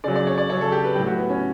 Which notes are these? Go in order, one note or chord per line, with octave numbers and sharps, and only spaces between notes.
C#3 F#3 D5
D5
C#5
D5
C#3 F#3 C#5
A4
G4
B4
A2 F#3 G4
F#4
B3
C#4